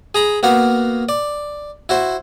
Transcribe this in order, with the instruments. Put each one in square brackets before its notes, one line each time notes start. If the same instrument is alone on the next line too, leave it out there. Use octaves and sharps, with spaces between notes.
[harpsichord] G#4 A#5 B5
A#3 B3 F#4 F5
D5
E4 F#4 C5